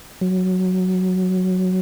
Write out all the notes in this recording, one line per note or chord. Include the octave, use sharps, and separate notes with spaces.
F#3